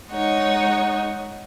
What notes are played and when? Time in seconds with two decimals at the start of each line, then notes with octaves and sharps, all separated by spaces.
0.11 G#3 D#4 C#5 F#5